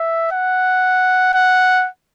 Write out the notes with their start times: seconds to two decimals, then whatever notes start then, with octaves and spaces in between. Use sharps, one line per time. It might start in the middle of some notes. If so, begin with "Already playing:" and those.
Already playing: E5
0.32 F#5
1.34 F#5